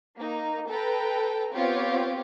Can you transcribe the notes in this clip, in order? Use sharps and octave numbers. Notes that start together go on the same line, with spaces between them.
A#3 D#4
A4 B4 G5 A#5
B3 C4 F4 G4 C#5